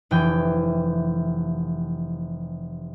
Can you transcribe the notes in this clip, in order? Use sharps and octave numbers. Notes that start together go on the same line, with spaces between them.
F1 E3 G5